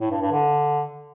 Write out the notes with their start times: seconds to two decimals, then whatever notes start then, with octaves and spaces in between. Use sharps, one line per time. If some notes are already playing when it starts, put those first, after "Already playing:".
0.01 A2
0.11 G2
0.22 G2
0.32 D3